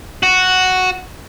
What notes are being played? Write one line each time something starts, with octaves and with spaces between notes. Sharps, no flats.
F#4